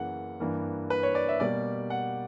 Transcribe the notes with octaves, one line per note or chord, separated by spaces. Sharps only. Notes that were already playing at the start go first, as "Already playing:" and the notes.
Already playing: F#2 C#3 E3 A#3 F#5
G2 E3 A#3
B4
C#5
D5
E5
B2 G3 A#3 D5
F#5